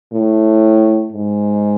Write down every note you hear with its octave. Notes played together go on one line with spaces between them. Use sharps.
A2
G#2